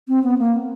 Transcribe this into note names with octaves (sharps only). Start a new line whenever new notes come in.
C4
B3
A#3